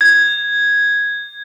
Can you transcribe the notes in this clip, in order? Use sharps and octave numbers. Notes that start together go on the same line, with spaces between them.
G#6